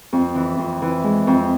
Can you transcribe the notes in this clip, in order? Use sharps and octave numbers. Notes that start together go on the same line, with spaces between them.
F2
E3
F2
E3
G#3
F2